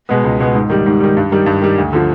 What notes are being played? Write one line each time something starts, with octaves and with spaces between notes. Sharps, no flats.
B2 G#3 B3
C#2
B2 G#3 B3
G#2
D#3 G3
G#2
D#3 G3
G2
D#3 G3
G2
D#3 G3
D2
D3 F3